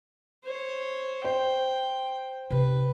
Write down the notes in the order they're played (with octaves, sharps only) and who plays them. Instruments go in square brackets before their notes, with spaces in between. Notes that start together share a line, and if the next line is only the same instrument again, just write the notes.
[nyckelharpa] C5 C#5
[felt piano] C5 [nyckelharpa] G5
[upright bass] C3 D#4 [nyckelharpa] B4